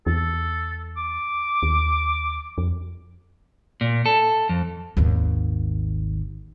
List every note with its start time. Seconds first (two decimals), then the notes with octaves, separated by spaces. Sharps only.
0.07 E2 A4
0.97 D6
1.63 D#2
2.58 F2
3.81 A#2
4.06 A4
4.49 F2
4.97 G#1 D#2